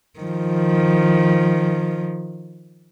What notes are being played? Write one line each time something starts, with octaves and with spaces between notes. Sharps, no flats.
D#3 F3